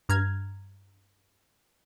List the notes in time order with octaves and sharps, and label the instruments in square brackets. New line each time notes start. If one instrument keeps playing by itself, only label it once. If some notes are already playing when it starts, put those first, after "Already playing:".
[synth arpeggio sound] G2 A#5 F6 G#6